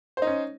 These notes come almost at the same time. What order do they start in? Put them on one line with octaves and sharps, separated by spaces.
C5 D#4 C#4